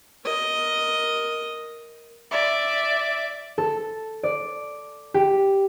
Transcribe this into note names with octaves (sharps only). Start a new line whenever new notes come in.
A#4 D#5
D5 E5
A4
D5
G4